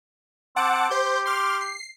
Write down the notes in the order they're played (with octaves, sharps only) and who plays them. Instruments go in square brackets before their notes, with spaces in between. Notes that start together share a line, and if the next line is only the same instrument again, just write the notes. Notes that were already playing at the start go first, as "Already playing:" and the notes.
[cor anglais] C4 [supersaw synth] F#5 A5 D6
[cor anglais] G4 [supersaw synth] C5 G6
[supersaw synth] C6 D6 F6
C7